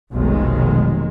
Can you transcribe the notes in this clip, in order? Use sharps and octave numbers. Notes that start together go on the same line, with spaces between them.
F1 B1 D#3 G#3